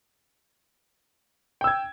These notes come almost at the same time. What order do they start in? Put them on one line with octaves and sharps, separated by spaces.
G5 E6 G#6